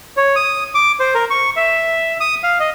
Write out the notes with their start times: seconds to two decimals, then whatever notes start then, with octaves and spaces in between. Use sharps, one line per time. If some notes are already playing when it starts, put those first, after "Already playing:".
0.17 C#5
0.36 D#6
0.75 D6
1.00 C5
1.15 A#4
1.30 C#6
1.57 E5
2.20 D#6
2.43 F5
2.60 D#5